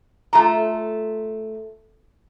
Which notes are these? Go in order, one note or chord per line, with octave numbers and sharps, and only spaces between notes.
A3 F4 A5 A#5